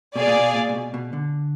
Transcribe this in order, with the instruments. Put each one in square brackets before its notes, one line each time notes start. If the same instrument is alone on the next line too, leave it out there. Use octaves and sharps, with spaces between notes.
[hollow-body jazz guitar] B2 [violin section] G#4 D5 F5 G#5
[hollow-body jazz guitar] A#2
B2
A#2
A#2
B2
B2
D3